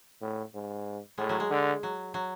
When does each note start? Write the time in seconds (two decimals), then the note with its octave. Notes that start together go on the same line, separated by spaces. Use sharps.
0.21 A2
0.54 G#2
1.18 A2 G#3
1.29 F#3
1.40 G#3
1.50 D3
1.83 F#3
2.14 F#3